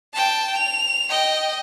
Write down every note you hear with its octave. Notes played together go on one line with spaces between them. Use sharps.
G5 A5
F7
D#5 G5